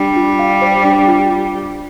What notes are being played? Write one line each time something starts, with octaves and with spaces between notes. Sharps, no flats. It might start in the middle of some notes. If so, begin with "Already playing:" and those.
Already playing: G3 D4
F4
F5
C5
D4
F4